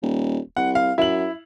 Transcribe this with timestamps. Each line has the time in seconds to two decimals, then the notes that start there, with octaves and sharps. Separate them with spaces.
0.02 D#1
0.57 C2 F#5
0.75 F5
0.98 F#2 E4 F#7